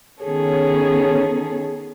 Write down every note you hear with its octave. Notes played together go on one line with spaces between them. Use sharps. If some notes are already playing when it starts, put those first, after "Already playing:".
D#3 B3 C#4 G#4 A4 C#5